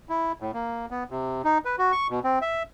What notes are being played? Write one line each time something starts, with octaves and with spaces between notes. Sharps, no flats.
E4
A2
A#3
B3
C3
D#4
B4
F#4
C#6
B2
C4
E5